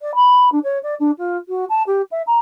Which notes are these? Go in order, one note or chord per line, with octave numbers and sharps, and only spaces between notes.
D5
B5
D4
C#5
D5
D4
F4
F#4
A5
G4
E5
A#5